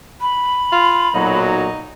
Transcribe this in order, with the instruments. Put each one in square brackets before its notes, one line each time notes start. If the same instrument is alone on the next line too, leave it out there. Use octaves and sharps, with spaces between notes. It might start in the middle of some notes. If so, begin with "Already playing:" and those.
[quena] B5
[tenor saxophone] F4
[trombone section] B1 A#2 F#3 [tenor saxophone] D#4